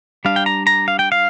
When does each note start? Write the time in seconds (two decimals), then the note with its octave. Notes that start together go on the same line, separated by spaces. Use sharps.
0.25 G3 D4 F5
0.36 G5
0.46 A#5
0.67 A#5
0.88 F5
0.99 G5
1.12 F5